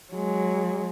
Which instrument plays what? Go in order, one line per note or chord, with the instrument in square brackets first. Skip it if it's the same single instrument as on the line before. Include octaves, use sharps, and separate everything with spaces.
[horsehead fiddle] F#3 G#3